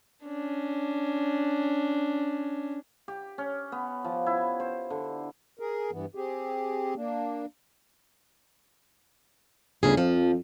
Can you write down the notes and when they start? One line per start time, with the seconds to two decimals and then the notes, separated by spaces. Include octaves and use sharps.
0.24 C#4 D4
3.08 G4
3.38 C#4
3.72 B3
4.04 F3
4.26 E4
4.60 C5
4.90 D3
5.59 G#4 A#4
5.91 G2 E3 B3
6.15 C4 G4 G#4
6.96 A#3 D4
9.83 G1 D2 C#3 G#4
9.97 F2 F3